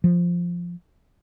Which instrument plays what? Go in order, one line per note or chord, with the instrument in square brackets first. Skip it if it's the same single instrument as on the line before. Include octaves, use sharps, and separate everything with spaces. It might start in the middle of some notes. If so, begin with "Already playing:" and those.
[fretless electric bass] F3